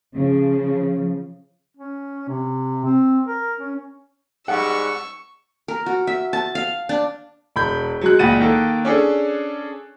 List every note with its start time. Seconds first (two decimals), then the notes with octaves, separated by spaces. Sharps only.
0.15 C#3 F3
1.77 C#4
2.29 C3
2.85 C4
3.27 A#4
3.60 C#4
4.48 G#2 G3 F#5 C#6 E6
5.68 A#4
5.86 F#4
6.07 E5
6.33 A5
6.55 F5
6.89 D4
7.56 E1 B5 G6
8.01 F#3 G#3 F#6
8.19 C#2 A#2 F#5 A6 D#7
8.40 D#3 A#3 A4
8.85 C#4 D4 G#4 A4